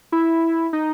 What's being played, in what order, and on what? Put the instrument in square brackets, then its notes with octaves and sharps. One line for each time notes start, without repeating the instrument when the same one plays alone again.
[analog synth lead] E4
D#4